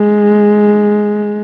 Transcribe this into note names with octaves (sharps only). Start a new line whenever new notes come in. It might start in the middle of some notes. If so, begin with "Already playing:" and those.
Already playing: G#3